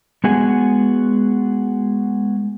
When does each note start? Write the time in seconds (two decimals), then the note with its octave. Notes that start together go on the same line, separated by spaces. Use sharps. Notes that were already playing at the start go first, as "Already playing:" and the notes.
0.24 G#3 B3 F#4 G#4 G#5